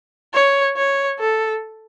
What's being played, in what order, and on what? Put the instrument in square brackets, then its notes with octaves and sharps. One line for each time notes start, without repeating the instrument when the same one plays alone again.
[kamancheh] C#5
C#5
A4